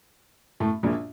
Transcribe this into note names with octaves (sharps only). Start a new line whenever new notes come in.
A2 A3
A#1 A#2